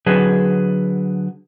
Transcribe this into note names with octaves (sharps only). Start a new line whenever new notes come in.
D3 F#3 G#4 B4 A5